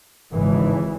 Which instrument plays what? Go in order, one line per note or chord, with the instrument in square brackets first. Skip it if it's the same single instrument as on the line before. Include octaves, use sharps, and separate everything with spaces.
[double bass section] G#1 G#2 C#3 E3